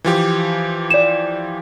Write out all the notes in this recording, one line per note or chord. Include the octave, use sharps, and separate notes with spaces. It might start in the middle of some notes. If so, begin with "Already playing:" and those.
E3 F3 G4
D5 E7